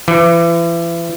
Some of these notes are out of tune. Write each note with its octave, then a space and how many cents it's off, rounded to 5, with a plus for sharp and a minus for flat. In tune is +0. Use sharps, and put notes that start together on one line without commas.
E3 +35